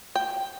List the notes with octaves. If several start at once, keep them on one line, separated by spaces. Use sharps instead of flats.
G5